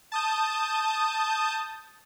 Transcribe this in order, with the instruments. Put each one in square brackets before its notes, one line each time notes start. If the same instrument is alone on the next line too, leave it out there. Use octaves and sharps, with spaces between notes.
[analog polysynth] A5 D#6 G6